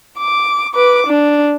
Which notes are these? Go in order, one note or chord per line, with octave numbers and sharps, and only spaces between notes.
D6
B4 D6
D4